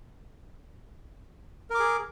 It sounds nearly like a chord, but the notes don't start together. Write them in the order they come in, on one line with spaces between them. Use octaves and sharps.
A#4 D6 G#4